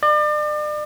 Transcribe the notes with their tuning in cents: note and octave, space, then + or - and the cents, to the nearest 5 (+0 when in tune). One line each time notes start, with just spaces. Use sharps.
D5 +40